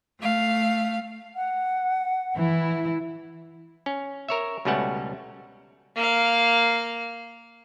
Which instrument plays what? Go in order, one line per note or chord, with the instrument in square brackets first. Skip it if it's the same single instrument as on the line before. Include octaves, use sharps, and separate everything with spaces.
[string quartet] A3 F5
[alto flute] F#5
[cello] E3 [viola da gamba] E4
[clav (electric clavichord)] C#4
A#4 C#5 E5
C#2 B2 G3 A3 C#4 F#5
[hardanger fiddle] A#3 F5